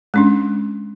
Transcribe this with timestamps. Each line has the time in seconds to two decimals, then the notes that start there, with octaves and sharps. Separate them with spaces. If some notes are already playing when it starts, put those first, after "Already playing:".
0.14 G#3 C#4 D4